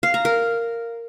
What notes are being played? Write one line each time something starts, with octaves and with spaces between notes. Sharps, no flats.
F5
A#5
A#4